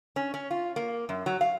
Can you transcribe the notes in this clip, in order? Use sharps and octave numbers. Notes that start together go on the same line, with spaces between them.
C#4
C#4
F4
A#3
F#2
F#3
F5